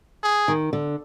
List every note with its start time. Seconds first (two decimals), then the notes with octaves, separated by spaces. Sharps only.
0.23 G#4
0.48 D#3
0.73 D3